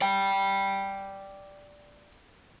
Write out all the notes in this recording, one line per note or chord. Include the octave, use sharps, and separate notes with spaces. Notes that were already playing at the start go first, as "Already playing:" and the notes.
D5 G5